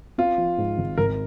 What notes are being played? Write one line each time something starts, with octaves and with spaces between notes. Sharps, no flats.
C4 F4
F3
G#2
G#1
G#1 A#4